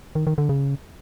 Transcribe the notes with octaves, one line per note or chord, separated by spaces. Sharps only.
D#3
D#3
D3
C#3